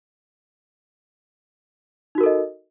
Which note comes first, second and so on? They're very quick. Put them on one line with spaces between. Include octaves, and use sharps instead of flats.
D#4 F#4 A#4 A4 D#5